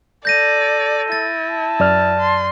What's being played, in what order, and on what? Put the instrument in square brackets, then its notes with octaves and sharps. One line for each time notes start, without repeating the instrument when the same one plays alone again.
[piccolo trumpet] A4 [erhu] D5 [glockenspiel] G6 A#6 D#7
[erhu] E4 [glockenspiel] A6
[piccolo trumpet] A5
[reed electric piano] F#2 D5 F6
[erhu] C6